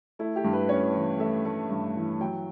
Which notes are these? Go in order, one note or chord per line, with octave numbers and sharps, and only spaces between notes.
A3 E4
G4
G2
B4
C#4 C#5
E3
A3 E5
A3
G2
E3
F#3 G5